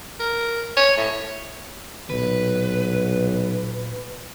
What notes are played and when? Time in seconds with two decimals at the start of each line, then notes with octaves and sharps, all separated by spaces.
0.20 A#4
0.77 C#5
0.97 A2
2.10 B1 A#2 B4